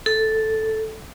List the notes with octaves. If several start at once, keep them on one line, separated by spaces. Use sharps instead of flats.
A4